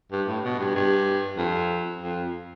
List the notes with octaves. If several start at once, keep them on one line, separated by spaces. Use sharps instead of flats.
G2
A2
B2
G2
G2
F2
F2